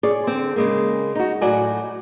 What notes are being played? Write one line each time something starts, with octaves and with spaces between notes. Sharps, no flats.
G#4 C#5 D5
D3 C4
C#3 G#3 A#3
D#4 F#4
A2 F#3 F#4 D5 G#5